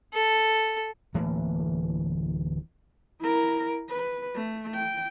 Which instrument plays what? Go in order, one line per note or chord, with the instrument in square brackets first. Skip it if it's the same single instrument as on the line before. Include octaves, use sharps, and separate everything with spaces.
[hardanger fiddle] A4
[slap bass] D1 E3 A3 A#3
[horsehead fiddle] E4 A#4
B4
A3
G5